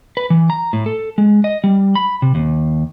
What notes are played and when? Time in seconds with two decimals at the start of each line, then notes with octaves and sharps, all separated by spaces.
0.17 B4
0.30 E3
0.50 A#5
0.73 A2
0.86 A4
1.18 G#3
1.44 D#5
1.64 G3
1.95 B5
2.22 C3
2.35 D#2